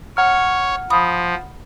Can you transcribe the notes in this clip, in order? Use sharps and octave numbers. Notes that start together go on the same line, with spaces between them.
C#5 F#5 A#5 F6
F3 B5 D#6